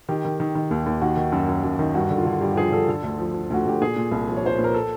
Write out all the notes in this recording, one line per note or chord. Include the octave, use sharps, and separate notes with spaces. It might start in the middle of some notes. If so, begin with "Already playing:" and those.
D#3 G4
D#3
D#3
D#3
D#2
D#2
D#3 F#4
D#3
F#2
F#2
F#2
D#3
G2 F#4
D3
F4
D3
G2 G4
G4
F3 G#4
D3 A4
D3 A4
D2
F3
F3
D2 F#4
D2 G4
A#2 G#4
A#2
C2
F3
C#5
F3 C5
A#2 B4
A#4
A4